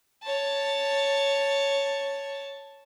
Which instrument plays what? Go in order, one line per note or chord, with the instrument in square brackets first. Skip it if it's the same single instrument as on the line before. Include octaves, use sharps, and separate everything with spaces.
[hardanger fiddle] C#5 A5